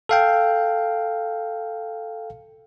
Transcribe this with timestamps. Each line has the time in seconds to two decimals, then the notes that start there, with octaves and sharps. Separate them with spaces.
0.09 A4 F5 G5